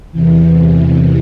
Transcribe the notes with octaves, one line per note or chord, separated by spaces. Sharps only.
E2 C3 E3